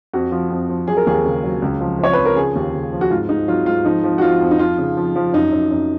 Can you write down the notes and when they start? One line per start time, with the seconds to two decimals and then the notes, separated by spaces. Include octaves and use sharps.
0.13 F2 F#4
0.31 F3
0.50 F2
0.69 F3
0.87 F#3 G#4
0.97 A#4
1.07 D#2 G#4
1.25 C#3
1.44 F#3
1.62 C#2
1.81 F3
1.99 F3 C#5
2.13 F3 B4
2.25 A#4
2.36 C#3 G#4
2.55 D#2
2.73 C#3
2.92 F3
3.01 F#4
3.10 G#2 F4
3.29 G#2 D#4
3.48 F#3 F4
3.66 G#2 F4
3.84 F3 D#4
4.03 F3
4.18 F#4
4.21 F3 F4
4.41 F2
4.51 D#4
4.59 F3 F4
4.78 C#3
4.97 F3
5.16 F3
5.33 F#2 D#4
5.52 F#2
5.71 F#2